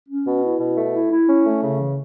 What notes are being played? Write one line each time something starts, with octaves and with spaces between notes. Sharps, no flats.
C#4
B2
E4
B2
A3
E4
E4
C#4
A3
C#3
E3